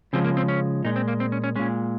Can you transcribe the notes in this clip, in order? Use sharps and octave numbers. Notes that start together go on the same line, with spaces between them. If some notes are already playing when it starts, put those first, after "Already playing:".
C#3 F3 G#3 C4
A#3
C4
C#4
A#2 G#3 D#4
C4
A#3
C4
C#4
C#4
A#2 G#3 C#4